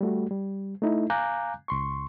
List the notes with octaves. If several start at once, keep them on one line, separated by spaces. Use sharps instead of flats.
G3 A3 F#4
G3
A3 D#4 E4
F5 G#5 A#5 D6 F#6 G6
C#2 C6 C#6